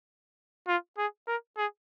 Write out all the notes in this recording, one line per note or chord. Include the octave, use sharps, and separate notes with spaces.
F4
G#4
A#4
G#4